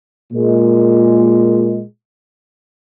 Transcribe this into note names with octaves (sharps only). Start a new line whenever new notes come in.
A#2 G#3